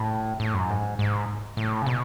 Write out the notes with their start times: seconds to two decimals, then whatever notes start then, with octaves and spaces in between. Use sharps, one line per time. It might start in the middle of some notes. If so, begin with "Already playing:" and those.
Already playing: A2
0.40 A2
0.54 F#2
0.70 G#2
0.99 G#2
1.57 A2
1.82 C#3
1.86 B2